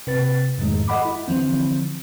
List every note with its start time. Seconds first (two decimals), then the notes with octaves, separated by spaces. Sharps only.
0.07 C3 B4 A6
0.58 F2 G#2 D#3 G#3 A3
0.88 A4 D#5 F#5 B5 D6
1.05 E4
1.28 D3 E3 F3 C4